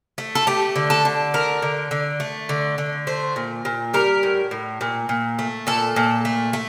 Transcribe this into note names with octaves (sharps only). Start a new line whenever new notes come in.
A3
A4
A3 G4
D3
A4
D3
A3 A#4
D3
D3
A3
D3
D3
A3 C5
A#2
A#2
G3 A#4
A2
A2
A#2
A#2
A3
A#2 A4
A#2
A3
A3